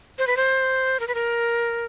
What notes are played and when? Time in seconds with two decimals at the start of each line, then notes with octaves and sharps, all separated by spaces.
0.19 C5
0.27 B4
0.37 C5
1.00 A#4
1.08 B4
1.15 A#4